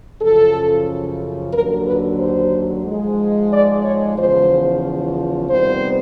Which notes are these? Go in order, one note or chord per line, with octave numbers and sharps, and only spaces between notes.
F#2 C#3 F3 A4
D#2 D3 F#3 A#4
B4
C5
G#2 F3 G#3
D5
C#5
E2 C#3 F3 C5
C3 D#3 G3 B3 C5